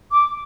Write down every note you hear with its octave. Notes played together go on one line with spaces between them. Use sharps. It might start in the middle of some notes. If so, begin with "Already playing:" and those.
D6